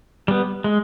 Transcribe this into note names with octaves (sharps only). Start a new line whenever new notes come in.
G3 B3
G#3